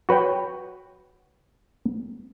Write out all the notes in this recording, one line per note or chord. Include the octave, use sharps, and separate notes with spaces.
F#4 B4 C#5 G5